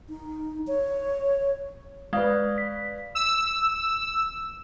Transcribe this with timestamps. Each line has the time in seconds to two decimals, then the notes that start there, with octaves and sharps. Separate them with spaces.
0.09 D#4
0.67 C#5
2.13 G#3 B4 D5 F5
2.58 B6
3.15 E6